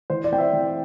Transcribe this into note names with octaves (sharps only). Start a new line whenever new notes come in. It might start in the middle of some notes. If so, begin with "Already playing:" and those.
E3 C5
D5
C4 G5
C5 E5
E3